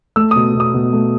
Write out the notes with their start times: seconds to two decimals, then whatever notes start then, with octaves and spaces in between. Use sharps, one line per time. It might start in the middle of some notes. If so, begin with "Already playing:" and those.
0.16 A3 E6
0.31 D#6
0.35 B2
0.55 B2
0.60 D#6
0.74 B2
0.93 A3